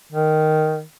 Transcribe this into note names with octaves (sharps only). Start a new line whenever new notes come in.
D#3